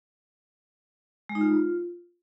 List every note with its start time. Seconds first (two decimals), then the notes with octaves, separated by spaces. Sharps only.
1.29 G#3
1.35 D#4
1.41 F4